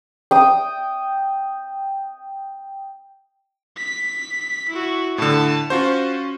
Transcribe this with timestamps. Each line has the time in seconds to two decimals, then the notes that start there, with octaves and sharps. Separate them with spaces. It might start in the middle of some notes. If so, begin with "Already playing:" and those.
0.31 G5 D#6
3.77 B6
4.69 E4 F#4
5.18 A2 D3 A5
5.70 C#4 F4 F#4 C5